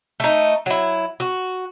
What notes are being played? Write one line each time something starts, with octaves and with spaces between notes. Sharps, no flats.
A3 D#4
F#3 E4
F#4